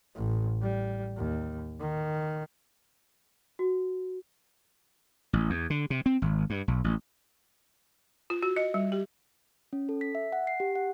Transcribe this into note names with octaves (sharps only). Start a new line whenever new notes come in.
A1
G3
D#2
D#3
F#4
A1
E2
D3
C3
C4
G#1
G2
B1
A1
F4
F#4
D#5
G3
G4
C#4
A4
B6
E5
F#5
C7
G4
F#5